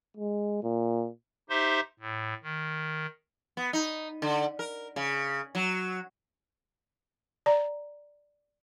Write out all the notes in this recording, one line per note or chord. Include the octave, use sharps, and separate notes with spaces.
G#3
A#2
D#4 G4 C5 E5 C6
A2
D#3
B3
D#4
D3
A#4
C#3
F#3
D5 A#5